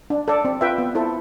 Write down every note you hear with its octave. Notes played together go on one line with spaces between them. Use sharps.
D4
A4 D5
C4
F4 B4 E5 G5
B3
E4 A4 C5